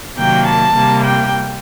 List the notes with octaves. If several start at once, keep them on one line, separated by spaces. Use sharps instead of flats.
C3 D#3 F#3 A#3 G5
A5
C3 G3 A#3
G5